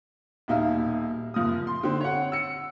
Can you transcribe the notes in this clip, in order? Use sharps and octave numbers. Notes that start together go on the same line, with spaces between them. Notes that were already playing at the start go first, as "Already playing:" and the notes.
D#1 B2 D#4 E5 F5
F#1 F3 D#6
C6
D3 C4
C#5 F#5
E6 C#7